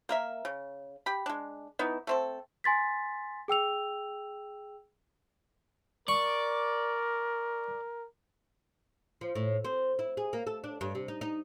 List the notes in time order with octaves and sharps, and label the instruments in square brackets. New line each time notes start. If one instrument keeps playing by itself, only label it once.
[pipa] A#3 A#4 E5
C#3
G4 B5
G#3 D4
E3 B3 D#4
A3 C4 A4
[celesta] G#5 C6 A6 B6
G#4 G5 E6 F7
[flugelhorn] A#4 [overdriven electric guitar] D5 [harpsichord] C#6
[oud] F3
A2
C4
E4
G#4
A#3
A4
D4
G2
C3
D#4
D#4